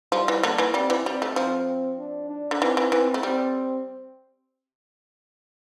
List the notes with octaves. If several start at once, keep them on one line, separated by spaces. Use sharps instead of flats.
F3 G3
E3
D3 A#3
E3
G3 C4
E3
G3 C4
A3
F3 C4
D4
D4
D3
E3 C4
E3
E3 C4
A3
G3 C4